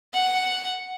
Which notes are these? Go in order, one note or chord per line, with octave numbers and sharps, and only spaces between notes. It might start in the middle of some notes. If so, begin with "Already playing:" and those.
F#5